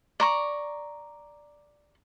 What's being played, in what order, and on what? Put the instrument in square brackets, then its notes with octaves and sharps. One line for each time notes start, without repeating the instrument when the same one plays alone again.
[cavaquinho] D5 A#5 C#6